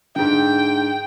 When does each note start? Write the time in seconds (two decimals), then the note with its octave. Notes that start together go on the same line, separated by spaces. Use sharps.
0.16 G#2 D3 G5